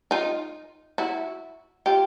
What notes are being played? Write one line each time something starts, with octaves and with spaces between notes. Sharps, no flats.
D#4 F4
E4 F#4
F4 G4